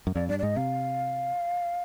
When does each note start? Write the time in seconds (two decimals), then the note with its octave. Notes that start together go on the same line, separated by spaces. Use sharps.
0.07 F#2
0.15 F2 D5
0.29 G2 D5
0.39 D5
0.43 G#2 D#5
0.56 C3 F5